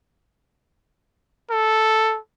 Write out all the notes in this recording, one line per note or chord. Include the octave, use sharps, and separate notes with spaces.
A4